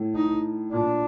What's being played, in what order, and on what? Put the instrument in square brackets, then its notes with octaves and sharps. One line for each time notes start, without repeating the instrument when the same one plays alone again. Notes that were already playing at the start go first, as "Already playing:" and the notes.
Already playing: [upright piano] A2
[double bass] D#4
[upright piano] A#2 [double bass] D4